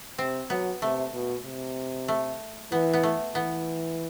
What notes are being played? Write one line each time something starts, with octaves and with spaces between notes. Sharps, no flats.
C3 C4
F#3 B3
C3 A3
B2
C3
A3
E3 B3
B3
A3
E3 B3